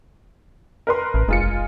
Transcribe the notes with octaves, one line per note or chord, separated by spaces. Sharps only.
A#4 B4 C6
A1
F1 G#3 F4 C#7